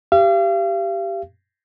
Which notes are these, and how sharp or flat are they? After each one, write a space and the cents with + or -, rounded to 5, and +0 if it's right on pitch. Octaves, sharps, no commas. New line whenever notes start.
G4 +0 F5 -40